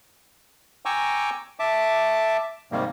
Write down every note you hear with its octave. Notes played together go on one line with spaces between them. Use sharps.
G5 G#5 A#5 C#6 D6 E6
E5 A5 D6
G#2 C3 D#3 G3 A#3